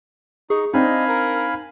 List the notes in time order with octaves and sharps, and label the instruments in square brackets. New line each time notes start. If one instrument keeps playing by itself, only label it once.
[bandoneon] D#4 C#6 [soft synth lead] G#4
[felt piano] C4 D4 [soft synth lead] D#4 [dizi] D#5 [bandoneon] F5 G#5 B5
[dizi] A#4